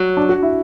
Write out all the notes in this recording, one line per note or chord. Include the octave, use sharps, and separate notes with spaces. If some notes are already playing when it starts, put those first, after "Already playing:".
Already playing: F#3
D4
F#4
E4